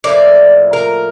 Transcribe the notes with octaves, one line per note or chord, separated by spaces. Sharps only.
A2 F3 A#3 D5
A#4